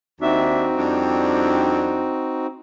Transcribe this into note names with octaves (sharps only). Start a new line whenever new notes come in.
D#2 C4 D4 D#4 F#4 E5
F2 G3 D4